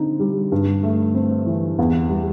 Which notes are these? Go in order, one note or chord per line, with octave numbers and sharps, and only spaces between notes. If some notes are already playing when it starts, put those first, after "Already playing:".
Already playing: D3 C4 D#4
G3
G2
A3
C4
E3
E2
G3